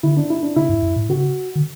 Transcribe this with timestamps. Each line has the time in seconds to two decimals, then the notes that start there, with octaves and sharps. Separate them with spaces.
0.03 D3 E4
0.17 D4
0.30 E4
0.42 D4
0.56 C#3 E4
0.69 G2
0.83 F#2
0.96 A2
1.09 C#3 F#4
1.56 D3